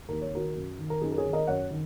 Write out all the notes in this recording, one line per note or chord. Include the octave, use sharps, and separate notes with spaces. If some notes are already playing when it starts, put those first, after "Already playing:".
D#2 A#4
C#5
D#3 F#4 A#4
F#2
D#3
A#4
F#2 D#4 G#4
A#4
G#4 C#5
D#3
A#4 D#5
F#2 C#5 F#5
D#3